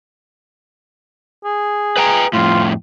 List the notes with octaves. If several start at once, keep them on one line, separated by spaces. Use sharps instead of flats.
G#4
B4 G5 A#5
F2 A2 F4